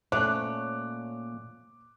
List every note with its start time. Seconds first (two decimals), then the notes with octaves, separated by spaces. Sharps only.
0.12 A#2 A3 C#4 C5 C#5 D6 F#6